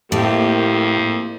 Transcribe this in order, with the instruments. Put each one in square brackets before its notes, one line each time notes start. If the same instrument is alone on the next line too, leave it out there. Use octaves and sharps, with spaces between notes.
[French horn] F2 [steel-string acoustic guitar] A2 [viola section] A#3 G4